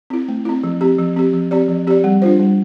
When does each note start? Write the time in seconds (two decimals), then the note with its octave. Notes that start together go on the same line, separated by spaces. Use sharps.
0.10 C4 E4
0.28 A3
0.45 C4 E4
0.64 F3
0.81 C4 G4
0.99 F3
1.16 C4 G4
1.33 F3
1.51 C4 G4 D5
1.69 F3
1.87 C4 G4 D5
2.04 G3
2.22 D4 F4 C5
2.39 G3